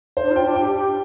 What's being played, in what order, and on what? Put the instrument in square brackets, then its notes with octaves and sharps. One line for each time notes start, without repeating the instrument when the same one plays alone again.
[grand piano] C5
[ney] D4
[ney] F4 [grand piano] G5
[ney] D4
[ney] G4 [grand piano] G5
[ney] G4